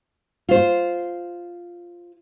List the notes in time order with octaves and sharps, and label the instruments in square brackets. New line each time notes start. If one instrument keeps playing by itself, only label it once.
[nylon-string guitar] F4 C5